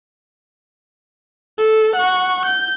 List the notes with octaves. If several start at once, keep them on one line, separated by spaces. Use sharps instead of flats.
A4
F#5 C#6
G6